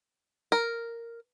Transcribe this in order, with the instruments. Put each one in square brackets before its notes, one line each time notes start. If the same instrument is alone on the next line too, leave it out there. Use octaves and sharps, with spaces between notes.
[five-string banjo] A#4